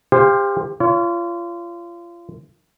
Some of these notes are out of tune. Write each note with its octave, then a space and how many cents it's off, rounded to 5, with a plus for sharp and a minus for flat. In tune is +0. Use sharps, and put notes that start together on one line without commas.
G4 +35 C5 +0 F5 +0
F4 -30 C#5 +30